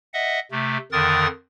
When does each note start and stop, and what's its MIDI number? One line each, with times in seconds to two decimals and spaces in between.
0.14 0.40 75
0.14 0.40 76
0.14 0.40 78
0.51 0.78 48
0.51 0.78 57
0.92 1.27 41
0.92 1.27 50
0.92 1.27 51
0.92 1.27 70
0.92 1.27 87
0.92 1.27 93